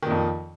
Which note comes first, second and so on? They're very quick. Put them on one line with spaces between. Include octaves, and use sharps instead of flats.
D#3 A#2 F2